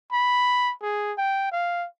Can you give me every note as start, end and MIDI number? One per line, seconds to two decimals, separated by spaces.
0.12 0.72 83
0.82 1.12 68
1.18 1.51 79
1.52 1.86 77